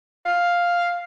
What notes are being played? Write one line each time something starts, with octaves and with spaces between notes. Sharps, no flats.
F5